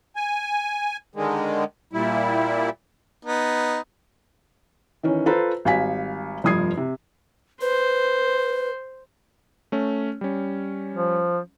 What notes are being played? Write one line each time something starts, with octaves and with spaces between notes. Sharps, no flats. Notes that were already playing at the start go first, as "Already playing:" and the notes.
G#5
D3 D#3 G#3
A#2 G3 E4
B3 D#4
D#3 E3 C#4
F4 A4 B4 C5 A#5
G#1 G3 F5 G#5 B6
F1 G2 F3 D#6 G#6 C7
C3
B4 C5
A3 C#4
G3 C#4
F3